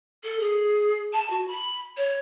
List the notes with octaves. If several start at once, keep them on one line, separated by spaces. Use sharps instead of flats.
A4
G#4
A5
F#4
B5
C#5